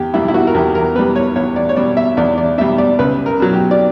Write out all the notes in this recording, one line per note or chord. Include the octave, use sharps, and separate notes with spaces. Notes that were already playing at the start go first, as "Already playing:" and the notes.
Already playing: E2 G4
B2 G3 E4
E4
F#4
A#4
E2 G4
A#4
B2 G3 B4
C#5
E2 C#5
D5
C#5
B2 G3 D5
E5
E2 D5
D5
B2 G3 E5
D5
C#2 B4
A#4
B2 F#3
G4
D5